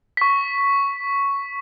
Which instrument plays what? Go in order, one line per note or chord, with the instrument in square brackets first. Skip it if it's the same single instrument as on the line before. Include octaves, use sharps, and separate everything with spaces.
[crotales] C#6 B6